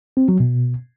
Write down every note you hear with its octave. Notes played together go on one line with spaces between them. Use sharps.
C4
F#3
B2